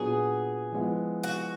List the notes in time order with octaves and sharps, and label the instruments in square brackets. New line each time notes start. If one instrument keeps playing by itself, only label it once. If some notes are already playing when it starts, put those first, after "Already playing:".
Already playing: [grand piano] A#2 F#3 B3 D4 F#4 [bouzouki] G#4
[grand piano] F3 G#3 B3 E4
[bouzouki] F#4